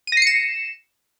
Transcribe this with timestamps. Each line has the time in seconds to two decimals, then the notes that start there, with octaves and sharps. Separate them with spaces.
0.07 D#7
0.12 A#6
0.17 C7
0.22 C#7
0.27 E7